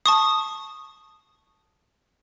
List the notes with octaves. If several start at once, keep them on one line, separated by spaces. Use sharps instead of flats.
A5 C#6 D#6